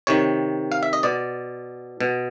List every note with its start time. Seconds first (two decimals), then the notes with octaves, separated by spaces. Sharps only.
0.07 C3 D#3 C#5
0.72 F5
0.83 E5
0.93 D#5
1.03 B2 D5
2.00 B2